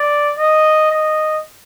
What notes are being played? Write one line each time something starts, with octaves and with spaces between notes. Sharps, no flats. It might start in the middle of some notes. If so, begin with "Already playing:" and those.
Already playing: D5
D#5
D#5